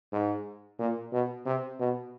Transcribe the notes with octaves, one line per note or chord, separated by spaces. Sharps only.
G#2
A#2
B2
C3
B2